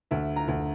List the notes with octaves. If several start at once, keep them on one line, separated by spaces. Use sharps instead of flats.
D2 E5
A#5
D2